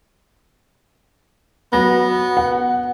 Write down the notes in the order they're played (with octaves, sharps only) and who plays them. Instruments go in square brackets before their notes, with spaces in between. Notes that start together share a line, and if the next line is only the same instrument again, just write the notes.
[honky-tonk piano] F#3 A#6 [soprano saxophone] B3
[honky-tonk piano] F#5